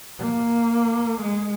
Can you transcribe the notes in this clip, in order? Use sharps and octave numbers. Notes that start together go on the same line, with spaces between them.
A#3
G#3